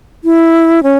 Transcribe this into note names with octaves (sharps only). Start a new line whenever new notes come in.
E4
C#4